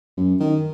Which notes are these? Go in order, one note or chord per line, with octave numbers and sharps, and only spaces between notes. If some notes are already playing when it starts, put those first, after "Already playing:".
F#2
D#3